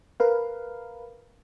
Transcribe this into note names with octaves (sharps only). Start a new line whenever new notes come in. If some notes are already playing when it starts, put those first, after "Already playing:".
A#4 B4 F5